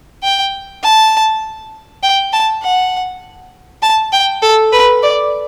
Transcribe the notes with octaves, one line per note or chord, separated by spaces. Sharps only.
G5
A5
G5
A5
F#5
A5
G5
A4
B4
D5